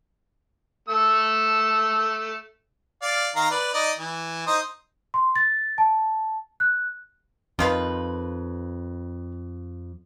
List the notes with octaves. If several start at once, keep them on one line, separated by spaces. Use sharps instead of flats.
A3 E6
D5 F5
D#3 F5 A#5
B4 D5
D#4 D5 D#5
E3
D#4 C5 D#6
C6
A6
A5
F#6
F2 D#3 F4 B4